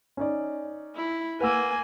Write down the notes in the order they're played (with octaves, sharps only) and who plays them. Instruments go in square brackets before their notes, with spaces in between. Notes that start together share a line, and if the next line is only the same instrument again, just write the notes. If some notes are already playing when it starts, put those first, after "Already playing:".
[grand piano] C#4 D#4 D5
[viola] E4
[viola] A#3 G#5 [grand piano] B4 F#5 E6